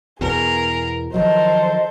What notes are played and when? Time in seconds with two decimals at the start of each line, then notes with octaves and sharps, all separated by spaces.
0.21 E2 B2 G#4 A#4
1.14 D#3 F3 F#3 A4 A#4 C5 D#5